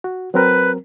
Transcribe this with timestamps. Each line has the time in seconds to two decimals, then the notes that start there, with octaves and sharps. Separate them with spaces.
0.04 F#4
0.34 F#3 C4 A#4 B4